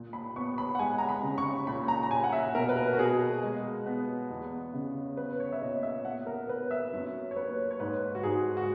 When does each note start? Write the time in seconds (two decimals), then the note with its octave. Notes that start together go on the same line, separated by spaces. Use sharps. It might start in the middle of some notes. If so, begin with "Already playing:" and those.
Already playing: A#2
0.13 B5
0.36 B3 C#6
0.58 B5
0.75 F#5
0.79 G#3 G#5
0.98 A#5
1.09 B5
1.23 C#3
1.38 C#6
1.67 A#2 B5
1.88 A#5
2.03 A#5
2.11 A#2 G#5
2.24 F#5
2.33 E5
2.55 B2 A#4
2.69 B4
2.76 A#4
2.93 F#4
2.98 B2 G#4
3.43 G#3
3.86 B3
4.30 E2
4.74 C#3
5.17 B3 B4
5.40 C#5
5.52 E5
5.61 A#2 D#5
5.83 E5
6.05 B3 F#5
6.27 A#4
6.49 B3 B4
6.71 E5
6.93 F#2 C#5
7.31 C#5
7.36 A#3 B4
7.71 C#5
7.80 G#2 B4
8.15 F#4
8.23 G#2 G#4
8.57 F#4